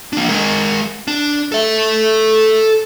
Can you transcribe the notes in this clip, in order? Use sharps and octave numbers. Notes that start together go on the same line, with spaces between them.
A#3 D4
G#3 A#4
D4
A4 E5